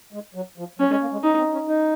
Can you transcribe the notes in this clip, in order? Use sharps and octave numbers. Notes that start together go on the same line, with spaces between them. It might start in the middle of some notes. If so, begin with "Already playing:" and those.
G#3
F#3
F3
F#3 C#4
G#3
A#3
G#3
D#4
C4
C#4
D#4